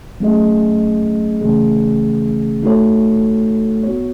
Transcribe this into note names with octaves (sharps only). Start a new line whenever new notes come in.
F#3 A3 C#4 G#4 D#5
C#3 E3 A3 C#4 G#4
A3 D#4 F#4 A4 C#5
B3 F#4 C#5